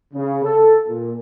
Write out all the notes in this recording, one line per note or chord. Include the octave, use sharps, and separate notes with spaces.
C#3
A4
A#2